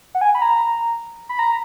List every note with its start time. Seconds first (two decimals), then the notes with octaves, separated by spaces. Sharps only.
0.15 F#5
0.21 G#5
0.35 B5
0.42 A#5
1.29 B5
1.39 A#5